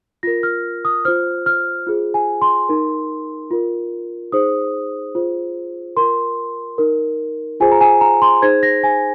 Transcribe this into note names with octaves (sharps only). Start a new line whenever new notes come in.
F4 A#4 A#6
F6
D#6
F4 C5 F6
F6
F4 G#4 C5
G#5
C6
D#4 A#4
F4 A#4
D#4 G#4 C5 D#6
F4 G#4 C5
F4 A#4 C6
D#4 A#4
F4 G#4 C5 G#5
A#5
G#5
A#5
C6
D#4 G#4 C5 G#6
A#6
G#5